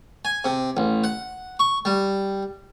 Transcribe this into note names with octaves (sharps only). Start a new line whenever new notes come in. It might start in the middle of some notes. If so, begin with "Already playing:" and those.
G#5
C3
A1
F#5
C#6
G3